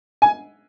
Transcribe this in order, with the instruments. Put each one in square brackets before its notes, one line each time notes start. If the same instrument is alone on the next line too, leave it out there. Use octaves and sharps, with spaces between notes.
[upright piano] G#5